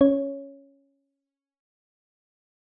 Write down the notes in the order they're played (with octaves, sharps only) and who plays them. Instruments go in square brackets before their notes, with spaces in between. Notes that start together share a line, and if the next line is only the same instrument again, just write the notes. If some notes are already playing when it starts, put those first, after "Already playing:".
[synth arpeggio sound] C#4 C#5